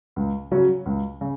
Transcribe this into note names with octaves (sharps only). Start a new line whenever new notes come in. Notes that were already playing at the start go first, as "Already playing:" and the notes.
C#2
C#3 F#3 C#4
C#2
C#3